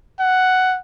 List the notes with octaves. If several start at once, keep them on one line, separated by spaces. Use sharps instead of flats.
F#5